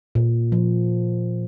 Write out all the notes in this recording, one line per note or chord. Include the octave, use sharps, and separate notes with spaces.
A#2
F3